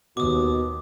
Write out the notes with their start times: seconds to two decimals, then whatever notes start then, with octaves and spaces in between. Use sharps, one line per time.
0.17 D#2 B2 D6 D#6